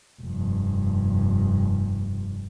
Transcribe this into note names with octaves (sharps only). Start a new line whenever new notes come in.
F1 G2